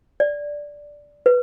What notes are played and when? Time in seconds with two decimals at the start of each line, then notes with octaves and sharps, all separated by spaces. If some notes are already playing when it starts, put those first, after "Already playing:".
0.20 D5
1.26 B4